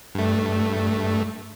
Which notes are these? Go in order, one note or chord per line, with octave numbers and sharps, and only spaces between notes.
G2 A3